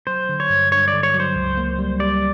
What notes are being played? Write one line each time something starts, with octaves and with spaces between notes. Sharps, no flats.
F#3 C5
D3
C#5
G2
G2 C#5
D5
D3
C#5
F#3
C5
C#2
A#3
G3
G3 D5